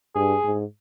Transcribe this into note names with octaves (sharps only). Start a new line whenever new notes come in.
G2 G#4
G#2